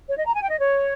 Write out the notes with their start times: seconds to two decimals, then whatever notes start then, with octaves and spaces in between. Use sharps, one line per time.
0.08 C#5
0.17 D#5
0.26 A#5
0.35 G#5
0.42 G5
0.51 D#5
0.59 C#5